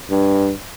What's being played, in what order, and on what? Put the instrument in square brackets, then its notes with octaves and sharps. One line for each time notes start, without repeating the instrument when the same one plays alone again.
[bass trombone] G2